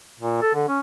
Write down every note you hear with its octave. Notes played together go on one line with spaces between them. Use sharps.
A#2
A4
D3
C#4